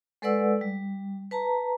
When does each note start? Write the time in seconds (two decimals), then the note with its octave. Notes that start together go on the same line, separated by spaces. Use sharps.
0.22 G#3 A4 B4 D5 F#5 E6
0.61 G3
1.31 B4 A5 A#5